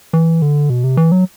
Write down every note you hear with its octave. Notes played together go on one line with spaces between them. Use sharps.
E3
D3
B2
C3
E3
F#3